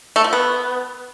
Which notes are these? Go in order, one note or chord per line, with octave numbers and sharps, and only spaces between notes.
A3
F3
B3